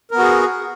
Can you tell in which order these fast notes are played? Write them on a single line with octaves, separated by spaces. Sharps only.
A#4 B3 F#4 G#4